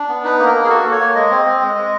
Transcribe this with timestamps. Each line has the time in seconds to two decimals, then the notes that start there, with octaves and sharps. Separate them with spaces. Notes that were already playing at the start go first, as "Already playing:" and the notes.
Already playing: D4
0.09 B3
0.24 D#4 B4
0.39 A#3
0.46 A#4
0.55 A#3
0.64 G#4
0.70 F#4 A4
0.85 A#3
0.92 C#5
0.99 A#3
1.15 G#3 D#5
1.30 C4
1.46 C4
1.61 G#3
1.76 G#3